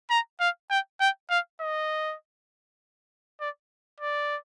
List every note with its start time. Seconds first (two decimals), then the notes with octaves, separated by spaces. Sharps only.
0.10 A#5
0.40 F5
0.70 G5
1.00 G5
1.30 F5
1.61 D#5
3.40 D5
4.00 D5